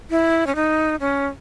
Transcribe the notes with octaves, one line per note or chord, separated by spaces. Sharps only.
E4
C#4
D#4
C#4